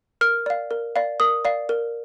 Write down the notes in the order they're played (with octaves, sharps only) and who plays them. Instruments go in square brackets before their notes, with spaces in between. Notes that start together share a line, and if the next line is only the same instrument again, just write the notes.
[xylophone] A#4 F6
D5 F5
A#4
D5 F5
A#4 D#6
D5 F5
A#4